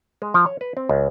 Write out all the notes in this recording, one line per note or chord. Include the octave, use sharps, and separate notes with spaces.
G#3
F3
C#5
B4
C4
C#2